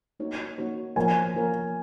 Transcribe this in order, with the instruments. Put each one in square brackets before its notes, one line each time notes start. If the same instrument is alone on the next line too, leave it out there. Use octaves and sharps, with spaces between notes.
[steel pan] A#3 D#4 F#4 C#5
A#3 D#4 F#4 C#5
[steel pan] F3 A#3 F4 A#4 C#5 [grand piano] G#5
[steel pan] F3 A#3 F4 A#4 C#5